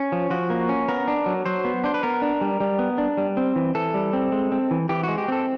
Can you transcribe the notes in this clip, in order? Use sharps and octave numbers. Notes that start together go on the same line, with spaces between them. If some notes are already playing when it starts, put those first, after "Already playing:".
Already playing: C#4
F3
F3 F#4
A#3
C#4
B3 A#4
D4
F#3
F#3 C5
B3
D4 C5
B4
B3 A#4
D4
G3
G3
B3
D4
G3
C4
E3
E3 A4
G3
C4
G#3
C4
E3
E3 G4
G#3 F#4
G4
C4 A4